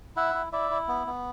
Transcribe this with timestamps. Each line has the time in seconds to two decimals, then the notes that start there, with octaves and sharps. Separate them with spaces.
0.17 E4 E5 F#5
0.34 E4
0.52 E4 D5 E5
0.71 E4
0.88 B3
1.07 B3